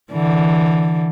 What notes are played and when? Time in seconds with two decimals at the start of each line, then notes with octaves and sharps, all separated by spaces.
0.12 D3 E3